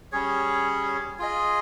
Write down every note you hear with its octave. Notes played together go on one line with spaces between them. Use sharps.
G3 C#4 G#4 C#5
F4 G#4 D#5